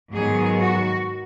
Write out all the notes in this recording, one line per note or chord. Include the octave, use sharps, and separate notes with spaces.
G#2 D#3 F#3 B3 G#4
F#4